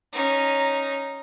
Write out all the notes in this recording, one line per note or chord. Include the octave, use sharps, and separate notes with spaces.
C#4 D#4